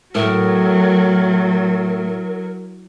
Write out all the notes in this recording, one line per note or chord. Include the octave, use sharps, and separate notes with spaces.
A2 F#3 A#4